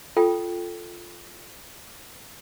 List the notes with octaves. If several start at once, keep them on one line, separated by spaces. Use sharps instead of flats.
F4 A4 G5